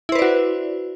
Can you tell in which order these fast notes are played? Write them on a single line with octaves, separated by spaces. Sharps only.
E4 C5 B4 D5 F#4